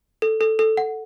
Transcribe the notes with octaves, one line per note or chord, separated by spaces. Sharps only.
A4
A4
A4
F#5